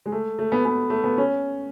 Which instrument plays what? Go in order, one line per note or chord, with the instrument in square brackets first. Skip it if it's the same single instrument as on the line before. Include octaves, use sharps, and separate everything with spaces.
[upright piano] G#3
A3
A3
B3
B3
A3
B3
C#4